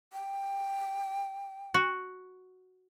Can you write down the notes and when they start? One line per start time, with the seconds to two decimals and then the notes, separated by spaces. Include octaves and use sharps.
0.13 G5
1.74 F#4